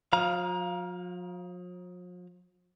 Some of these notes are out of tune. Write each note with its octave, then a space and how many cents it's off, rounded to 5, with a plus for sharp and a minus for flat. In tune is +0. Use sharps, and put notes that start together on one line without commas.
F3 +45 F5 +0 A#5 +25